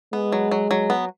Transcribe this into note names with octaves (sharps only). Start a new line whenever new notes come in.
G#3 B3
F#3
F#3
F#3
B3